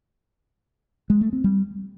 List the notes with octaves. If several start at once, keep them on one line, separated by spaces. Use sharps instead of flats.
G#3
A3
C4
G3